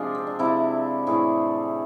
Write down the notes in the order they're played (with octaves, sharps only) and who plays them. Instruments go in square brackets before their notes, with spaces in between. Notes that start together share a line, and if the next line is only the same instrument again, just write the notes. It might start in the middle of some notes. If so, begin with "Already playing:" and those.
Already playing: [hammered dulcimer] C3 F3 G#3 D4 F4 G#4
C4
D4
C3 F3 G#3 C4 E4
A2 E3 A3 E4 G#4